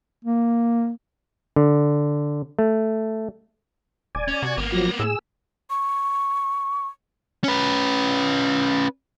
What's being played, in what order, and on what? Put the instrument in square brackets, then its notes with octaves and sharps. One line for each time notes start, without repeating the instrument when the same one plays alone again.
[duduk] A#3
[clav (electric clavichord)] D3
A3
[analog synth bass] D#1 [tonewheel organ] D5 G#5
[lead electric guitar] C#4
[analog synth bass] C3 [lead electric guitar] F#4
[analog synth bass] G#1 [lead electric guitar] A#3 B3
[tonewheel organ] F3 F#3 A#6
[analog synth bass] A2 [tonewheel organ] G#4 E6
[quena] C#6
[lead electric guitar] C#4 B4